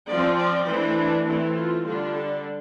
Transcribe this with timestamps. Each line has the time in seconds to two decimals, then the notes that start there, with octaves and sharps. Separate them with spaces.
0.11 F3 C4 D5
0.40 D5
0.69 E3 A3 D4 C5
0.98 D4
1.27 E3 A3 C4 E4
1.56 F4
1.85 D3 G3 D4 F4
2.14 A4